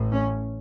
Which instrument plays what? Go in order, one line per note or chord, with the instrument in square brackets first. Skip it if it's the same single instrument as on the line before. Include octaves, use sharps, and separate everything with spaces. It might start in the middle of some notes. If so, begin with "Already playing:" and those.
Already playing: [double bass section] A1 A2
C#4